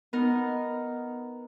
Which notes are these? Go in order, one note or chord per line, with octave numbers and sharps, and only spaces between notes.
B3 D#4 A#4